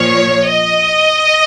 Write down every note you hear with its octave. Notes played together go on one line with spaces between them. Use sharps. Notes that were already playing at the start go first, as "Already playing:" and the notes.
Already playing: A#2 F3 C#5
D#5